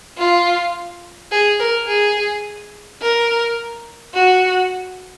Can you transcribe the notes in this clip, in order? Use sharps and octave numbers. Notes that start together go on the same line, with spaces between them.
F4
G#4
A#4
G#4
A#4
F#4